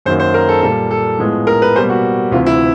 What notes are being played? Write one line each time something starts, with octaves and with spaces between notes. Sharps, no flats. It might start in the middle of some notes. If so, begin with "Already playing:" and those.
F#2 D#3 F#3 A#3 C5
C5
A#4
A4
A#2 G3 A#3 A4
A4
A2 F3 G#3 B3
A#4
B4
B2 G3 A#3 C5
F#4
D2 C3 E3 F4
E4